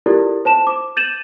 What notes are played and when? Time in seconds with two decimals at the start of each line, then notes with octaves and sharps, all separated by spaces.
0.06 E4 F4 G4 A4 A#4 D5
0.45 C5 A5 E7
0.67 D6
0.97 G6 A6 D#7 E7 F#7